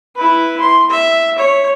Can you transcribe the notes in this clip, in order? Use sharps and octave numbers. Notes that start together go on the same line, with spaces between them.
E4 B4
C6
E5
C#5